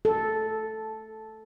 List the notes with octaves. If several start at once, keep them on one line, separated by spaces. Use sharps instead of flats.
A4